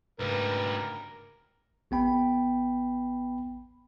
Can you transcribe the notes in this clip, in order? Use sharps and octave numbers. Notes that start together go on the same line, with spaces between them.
D2 G#2 C#3 G3 A#4 B4
A1 B3 G5 B5